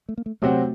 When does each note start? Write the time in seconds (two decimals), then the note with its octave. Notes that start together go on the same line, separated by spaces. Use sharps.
0.09 A3
0.18 A#3
0.26 A3
0.42 C3 F#3 A3 C4 F#4